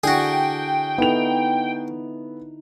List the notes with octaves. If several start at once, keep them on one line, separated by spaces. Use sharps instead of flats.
D3 D4 E4 F#4 G#4 G5
B3 D#4 E4 A4 F7